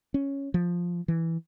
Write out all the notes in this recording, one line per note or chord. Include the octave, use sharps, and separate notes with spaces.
C#4
F3
E3